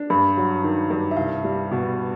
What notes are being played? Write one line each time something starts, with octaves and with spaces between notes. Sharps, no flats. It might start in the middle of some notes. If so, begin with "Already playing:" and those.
Already playing: D4
G2 B5
F#3
D#3
G2
E5
C2 F5
G3
B2